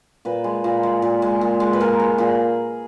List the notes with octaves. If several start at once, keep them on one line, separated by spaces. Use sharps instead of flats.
A#2 B4
G#3
A#2
G#3
A#2
G#3
A#2
G#3
B4
A#2 A#4
G#3
A#2 G#4